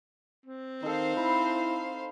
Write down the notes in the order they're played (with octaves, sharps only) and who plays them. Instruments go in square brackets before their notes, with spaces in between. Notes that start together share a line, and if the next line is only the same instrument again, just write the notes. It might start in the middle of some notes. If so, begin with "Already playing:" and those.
[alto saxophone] C4
[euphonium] D#3 [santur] D#4 A4 [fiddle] C5 F5
[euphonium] E4 [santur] B5